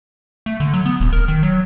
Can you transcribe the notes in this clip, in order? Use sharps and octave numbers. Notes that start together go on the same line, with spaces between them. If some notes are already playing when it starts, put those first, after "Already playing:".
A3
D3
F#3
B3
D#1
A#4
D#3
F#3